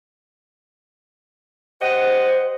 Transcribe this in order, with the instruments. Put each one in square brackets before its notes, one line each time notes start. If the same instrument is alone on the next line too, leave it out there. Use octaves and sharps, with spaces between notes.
[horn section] G4 D#5 F#5 [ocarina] C5